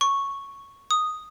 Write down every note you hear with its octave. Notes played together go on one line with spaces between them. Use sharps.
C#6
D#6